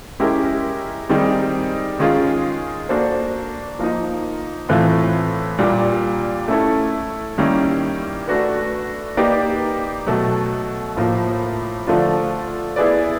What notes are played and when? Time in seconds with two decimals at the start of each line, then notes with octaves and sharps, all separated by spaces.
0.20 G#3 C#4 E4 G4 A#4
1.09 D#3 G3 C4 D#4 G#4
1.99 D#3 G#3 C#4 F4 G#4
2.89 A#3 D4 F#4 A4 C5
3.79 F3 A#3 D#4
4.69 A2 E3 A3 C4 F4
5.58 A#2 G3 A#3 D4
6.48 A3 C#4 E4 A4
7.38 D#3 G3 A#3 C#4 E4
8.27 A3 D4 F#4 B4
9.17 A#3 D#4 G4 B4 D5
10.07 B2 F#3 A3
10.97 A2 F3 A#3
11.87 D3 F3 A3 D4 F4
12.76 B3 E4 G#4 B4 D5